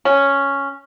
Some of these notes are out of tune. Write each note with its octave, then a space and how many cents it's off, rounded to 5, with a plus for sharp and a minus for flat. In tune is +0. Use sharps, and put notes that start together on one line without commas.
C#4 +0